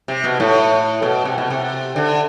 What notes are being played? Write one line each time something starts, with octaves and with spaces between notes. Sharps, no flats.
C3
B2
A2
B2
C3
B2
C3
D3